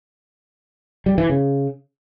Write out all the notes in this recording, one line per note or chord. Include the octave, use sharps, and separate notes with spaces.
G3
E3
C#3